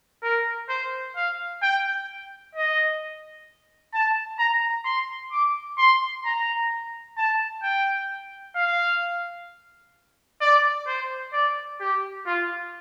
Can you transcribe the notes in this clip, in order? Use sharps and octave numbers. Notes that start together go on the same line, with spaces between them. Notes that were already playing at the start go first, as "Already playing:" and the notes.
A#4
C5
F5
G5
D#5
A5
A#5
C6
D6
C6
A#5
A5
G5
F5
D5
C5
D5
G4
F4